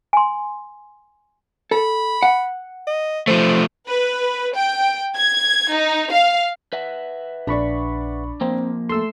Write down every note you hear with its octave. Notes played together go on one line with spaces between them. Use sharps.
G#5 C6
A4 B5
F#5
D#5
F3 A3 C5
B4
G5
G#6
D#4
F5
B4 E5 F#5
A#1 D4 D5 B5 C#6
F3 A#3 C4
A3 A4 C6 E6